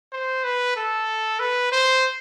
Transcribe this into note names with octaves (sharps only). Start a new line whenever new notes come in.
C5
B4
A4
B4
C5